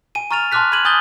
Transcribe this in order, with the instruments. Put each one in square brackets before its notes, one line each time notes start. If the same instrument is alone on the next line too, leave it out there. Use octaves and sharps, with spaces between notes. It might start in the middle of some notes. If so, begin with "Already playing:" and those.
[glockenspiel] G#5 D#7
A#5 C#6 F6 A6 D#7 F7
A5 C6 D6 F6 F#6 B6
B5 G#6 D#7 F#7
G#5 D#6 G6 A6 G7